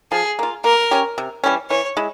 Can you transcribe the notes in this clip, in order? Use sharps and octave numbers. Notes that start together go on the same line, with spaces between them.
F3 G#4
A#3 F4
A#3 A#4
C#4 G4 C#5
C3
E3 G3 C#4
E3 C#5
G#3 E4